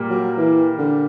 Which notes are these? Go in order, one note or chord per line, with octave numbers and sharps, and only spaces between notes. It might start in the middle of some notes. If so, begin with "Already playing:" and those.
Already playing: A#2 G3 A#3
F#3
E3
D3